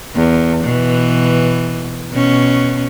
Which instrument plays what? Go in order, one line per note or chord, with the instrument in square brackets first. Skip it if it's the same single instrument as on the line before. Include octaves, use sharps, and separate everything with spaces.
[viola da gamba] E2
B2 E3
B2 C#4